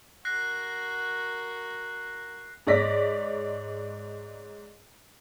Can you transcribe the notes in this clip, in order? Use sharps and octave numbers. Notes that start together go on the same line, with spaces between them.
F#4 A#4 F#6 A#6 C7
G#2 C#5 D5 A#6 B6